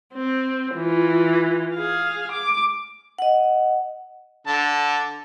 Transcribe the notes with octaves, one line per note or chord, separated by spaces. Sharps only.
C4
E3 F4
G#4 F5
D6
D#5 F#5
D3 A5